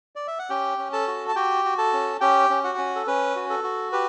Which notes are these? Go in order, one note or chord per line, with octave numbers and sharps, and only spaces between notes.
D5
E5
F#5
C#4 G4 G5
C#4
A4 A5
F#4
A5
F#4 G4 G5
F#4
A4 A5
C#4
C#4 G4 G5
C#4
F#4 F#5
C#4
A4
C#4 B4
F#4
A4
F#4
G4 B4